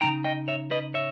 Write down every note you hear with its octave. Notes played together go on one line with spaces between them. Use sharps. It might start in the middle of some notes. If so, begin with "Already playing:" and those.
C#3 G#3 D#4 G5 A#5
D#5 G5
C#5 E5
B4 D#5
C#5 E5